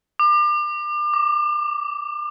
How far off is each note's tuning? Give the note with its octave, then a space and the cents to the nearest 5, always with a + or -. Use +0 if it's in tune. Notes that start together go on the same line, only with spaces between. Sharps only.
D6 +35
D6 -10